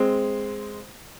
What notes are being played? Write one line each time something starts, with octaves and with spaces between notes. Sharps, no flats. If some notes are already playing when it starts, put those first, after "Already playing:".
Already playing: G#3 C4